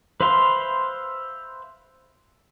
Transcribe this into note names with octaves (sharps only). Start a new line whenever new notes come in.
B4 C5 E5 F5 C6